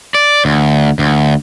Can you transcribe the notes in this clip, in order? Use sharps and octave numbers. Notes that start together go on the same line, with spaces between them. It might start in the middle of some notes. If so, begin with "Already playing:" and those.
D5
D2
D2